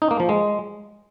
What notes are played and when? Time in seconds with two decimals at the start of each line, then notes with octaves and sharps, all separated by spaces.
0.02 D#4
0.11 A#3
0.20 F3
0.29 G#3